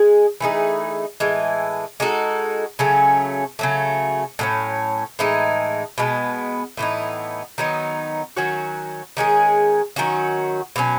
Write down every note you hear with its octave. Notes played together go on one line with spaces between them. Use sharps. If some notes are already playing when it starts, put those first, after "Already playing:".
Already playing: G#3 G#4
E3 A3 D#4 G#4
A2 E3 G#3
G#3 D#4 F#4 A4
C#3 F#3 A3 C#4
C#3 F#3 A3
A2 F#3 A3 C#4
A2 E3 G#3 D#4
B2 G#3 B3
A2 E3 B3 D#4
D#3 F#3 B3 D#4
D#3 F#3 C#4 F#4
D#3 G#3 C#4 G#4
D#3 F#3 C#4 F#4
B2 F#3 C#4